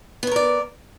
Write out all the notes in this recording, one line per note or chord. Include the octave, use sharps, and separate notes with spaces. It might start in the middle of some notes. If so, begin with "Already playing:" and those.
B3 A#4 C#5 D5